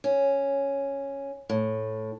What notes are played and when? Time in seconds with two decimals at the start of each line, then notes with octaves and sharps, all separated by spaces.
0.04 C#4
1.49 A2